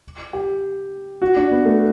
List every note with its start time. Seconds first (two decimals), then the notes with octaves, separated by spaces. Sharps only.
0.33 G4
1.22 F#4
1.36 D4
1.51 B3
1.65 A3